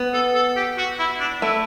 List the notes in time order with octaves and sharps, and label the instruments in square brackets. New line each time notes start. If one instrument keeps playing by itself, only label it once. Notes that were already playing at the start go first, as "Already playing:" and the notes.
Already playing: [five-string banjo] B3
[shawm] A4
A4
G4
F#4
E4
D4
[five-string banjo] A3 [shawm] E4